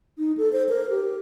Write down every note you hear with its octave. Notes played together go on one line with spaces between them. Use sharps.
D#4
A4
C5
A#4
G4